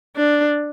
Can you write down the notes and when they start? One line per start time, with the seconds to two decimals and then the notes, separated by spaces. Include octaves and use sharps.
0.16 D4